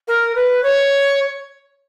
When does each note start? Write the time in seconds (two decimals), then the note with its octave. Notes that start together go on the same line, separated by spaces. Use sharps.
0.08 A#4
0.35 B4
0.63 C#5